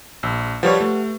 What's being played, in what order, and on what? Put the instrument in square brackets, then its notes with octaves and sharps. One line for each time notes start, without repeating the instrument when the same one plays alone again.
[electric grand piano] A#1 [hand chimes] E6
[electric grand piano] F3 G3 C#5 [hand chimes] G4 B4 F#5
[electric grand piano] A3